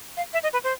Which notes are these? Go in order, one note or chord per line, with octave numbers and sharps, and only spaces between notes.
F5
E5
D#5
B4
C5